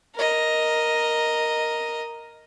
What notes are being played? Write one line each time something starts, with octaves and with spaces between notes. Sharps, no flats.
A#4 D#5